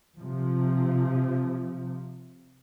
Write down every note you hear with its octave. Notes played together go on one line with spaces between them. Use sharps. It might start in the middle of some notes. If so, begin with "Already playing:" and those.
C3 F3